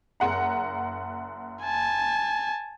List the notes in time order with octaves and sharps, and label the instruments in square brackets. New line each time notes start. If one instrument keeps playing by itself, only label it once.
[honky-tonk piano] F#1 F#5 A#5
[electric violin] G#5 A5